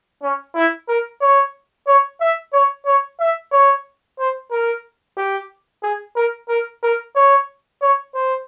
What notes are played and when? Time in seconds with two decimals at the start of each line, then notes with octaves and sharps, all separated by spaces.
0.23 C#4
0.56 E4
0.88 A#4
1.21 C#5
1.87 C#5
2.21 E5
2.53 C#5
2.86 C#5
3.20 E5
3.52 C#5
4.19 C5
4.51 A#4
5.17 G4
5.83 G#4
6.16 A#4
6.49 A#4
6.83 A#4
7.16 C#5
7.81 C#5
8.14 C5